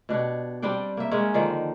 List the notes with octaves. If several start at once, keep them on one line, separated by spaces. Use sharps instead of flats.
B2 D4 G4 C#5
G3 C4 D4 G5
A#3 E5
G#3 C#4 A#4
D3 D#3 F3 D5